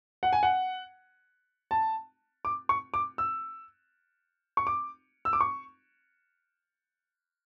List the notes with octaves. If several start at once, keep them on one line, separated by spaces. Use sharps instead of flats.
F#5
G#5
F#5
A5
D6
C#6
D6
E6
C#6
D6
E6
D6
C#6